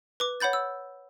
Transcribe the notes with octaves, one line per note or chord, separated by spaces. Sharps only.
B4 D6
C#5 F#5 B5 G6 A6
E6